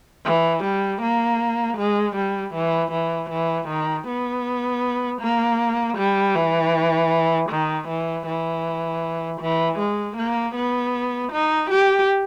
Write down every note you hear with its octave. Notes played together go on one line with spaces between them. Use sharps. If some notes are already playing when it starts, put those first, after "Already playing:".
E3
G3
A#3
G#3
G3
E3
E3
E3
D#3
B3
A#3
G3
E3
D#3
E3
E3
E3
G#3
A#3
B3
D#4
G4